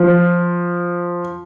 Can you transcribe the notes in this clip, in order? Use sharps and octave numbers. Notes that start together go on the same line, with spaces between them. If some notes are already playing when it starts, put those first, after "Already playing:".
Already playing: F3